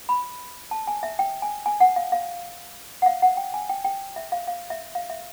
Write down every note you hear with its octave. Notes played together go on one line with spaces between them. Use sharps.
B5
A5
G#5
E5
G5
G#5
G#5
F#5
F5
F5
F#5
F5
F#5
G5
G#5
G5
G5
E5
F5
F5
E5
F5
E5